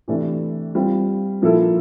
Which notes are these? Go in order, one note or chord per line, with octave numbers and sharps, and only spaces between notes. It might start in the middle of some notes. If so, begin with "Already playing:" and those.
C3 E3 A3 D4
G3 C4 F4
A#2 F3 A#3 E4 A4